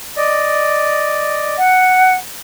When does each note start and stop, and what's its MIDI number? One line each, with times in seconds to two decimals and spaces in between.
0.17 1.55 74
0.17 1.55 75
1.58 2.15 78